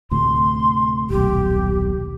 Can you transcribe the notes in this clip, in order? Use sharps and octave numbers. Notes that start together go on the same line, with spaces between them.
D2 A2 C3 C6
D#1 B1 G4